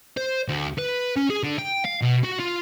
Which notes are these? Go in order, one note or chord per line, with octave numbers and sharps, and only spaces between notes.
C5
D2
B4
C#4
G#4
D3
G5
F5
B2
F#4
F4